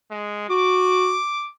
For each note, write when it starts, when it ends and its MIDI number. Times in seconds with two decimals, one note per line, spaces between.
0.11 0.49 56
0.50 1.16 66
0.50 1.47 86